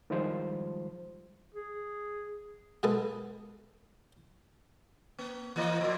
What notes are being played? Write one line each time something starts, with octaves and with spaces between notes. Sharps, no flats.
D#3 F3 G3 G#3 F4 C5
G#4
B2 G#3 A4 B4 D#6
A#3
E3 A#3 D#5
A#2 F3